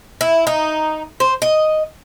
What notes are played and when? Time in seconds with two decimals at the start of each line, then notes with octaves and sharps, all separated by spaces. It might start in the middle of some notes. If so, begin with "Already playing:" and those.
0.21 E4
0.47 D#4
1.20 C5
1.42 D#5